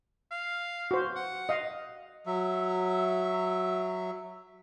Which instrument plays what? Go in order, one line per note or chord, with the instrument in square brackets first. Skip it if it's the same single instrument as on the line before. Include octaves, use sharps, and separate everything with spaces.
[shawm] F5
[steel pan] F#4 C5
[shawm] F#5
[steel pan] D#5 F5
[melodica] F#3 E5